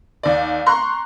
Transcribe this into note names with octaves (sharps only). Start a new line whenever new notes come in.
D#2 D5
A#5 C6 C#6 F#6